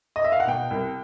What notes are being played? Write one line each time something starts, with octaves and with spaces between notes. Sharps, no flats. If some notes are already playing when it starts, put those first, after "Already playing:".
D#5
E5
F5
F#5
B2 G5
C2